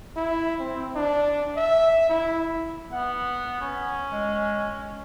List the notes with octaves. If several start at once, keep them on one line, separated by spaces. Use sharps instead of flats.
E4
C4
D4
E5
E4
B3 F#5
C#4
G#3